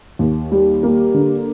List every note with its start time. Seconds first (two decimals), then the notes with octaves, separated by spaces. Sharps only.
0.19 D#2
0.52 G3
0.83 A#3
1.14 D3